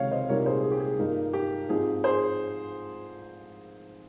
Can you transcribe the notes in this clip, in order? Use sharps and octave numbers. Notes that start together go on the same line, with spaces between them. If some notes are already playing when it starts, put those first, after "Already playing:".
Already playing: C#2 C3 D#3 C#5 F5
C5 D#5
C2 A#2 G3 C4 D#4 A#4 C#5
G#4 C5
G#4
G4
G#4
G2 F3 A#3 D#4
G4
G#2 F3 C4 D#4 G#4
G#4 C5